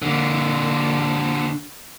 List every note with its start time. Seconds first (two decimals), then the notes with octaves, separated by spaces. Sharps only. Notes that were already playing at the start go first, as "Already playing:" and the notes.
0.02 D3 A#3